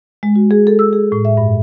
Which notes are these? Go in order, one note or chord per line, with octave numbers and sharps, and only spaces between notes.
G#3
F#4
G#4
A4
E6
G#4
A2
E5
G2